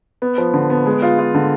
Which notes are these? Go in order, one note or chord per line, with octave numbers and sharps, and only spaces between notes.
B3
F3
D3
B3
G#3
F4
F4
D3